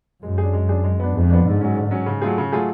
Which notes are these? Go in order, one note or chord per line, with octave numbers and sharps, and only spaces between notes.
F#2 G#3
G#4
D4
G#3
D4 G#4
G#3
B3 D4
F2 G#3
B3 D4
G#2 D3
F#3 C#4
D3
F#3 C#4
C#3
F#3 A3 F4 G#4
C#3
F#3 A3 F4 G#4